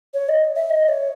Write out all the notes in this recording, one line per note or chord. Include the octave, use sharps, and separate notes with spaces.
C#5
D#5
E5
D#5
C#5